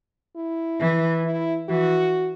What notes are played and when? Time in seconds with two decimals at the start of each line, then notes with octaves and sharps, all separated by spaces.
0.36 E4
0.80 E3
1.25 E4
1.69 E3 F#4